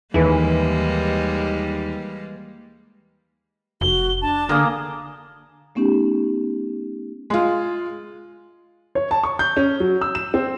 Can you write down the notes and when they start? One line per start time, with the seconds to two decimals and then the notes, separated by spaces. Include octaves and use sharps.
0.14 D#2 E3 G3 G#3 A#3 E4 G#4 B4
3.81 F1 F#4 G7
4.22 D4 A5
4.49 D3 A#3 G#4 A#4 D#6
5.75 A3 B3 C#4 D#4 G4
7.30 G#3 F4
8.95 C#5
9.11 A5
9.24 C#6
9.39 G6
9.57 C#4
9.80 F#3
10.01 E6
10.15 E7
10.34 C4